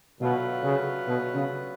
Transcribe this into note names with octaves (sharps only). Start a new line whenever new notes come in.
B2 D3 F#3 A3 F4 B4
C#3
B2
C#3